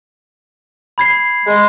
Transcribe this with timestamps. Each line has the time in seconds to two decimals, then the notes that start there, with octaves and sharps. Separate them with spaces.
0.98 B5 G#6 C7
1.46 G#3